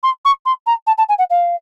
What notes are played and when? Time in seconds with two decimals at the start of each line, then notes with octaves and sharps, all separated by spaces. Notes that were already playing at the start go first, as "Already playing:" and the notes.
0.03 C6
0.25 C#6
0.45 C6
0.66 A#5
0.87 A5
0.98 A5
1.09 G#5
1.18 F#5
1.30 F5